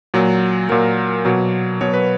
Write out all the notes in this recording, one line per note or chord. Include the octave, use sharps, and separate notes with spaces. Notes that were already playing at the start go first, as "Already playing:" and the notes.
A#2 F#3
A#2 F#3 A#4
B2 F#3
B2 F#3 C#5
B4